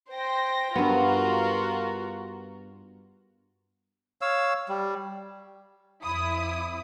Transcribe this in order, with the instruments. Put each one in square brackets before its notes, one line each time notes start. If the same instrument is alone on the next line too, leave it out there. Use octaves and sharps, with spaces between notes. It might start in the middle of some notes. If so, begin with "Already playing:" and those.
[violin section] C5 G5 A#6
[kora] G2 B3 [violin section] F4 F#4 A#4
[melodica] C#5 F5 E6
G3
[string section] F2 E4 D#6